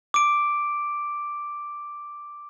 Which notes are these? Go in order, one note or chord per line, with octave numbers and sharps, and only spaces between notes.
D6 D7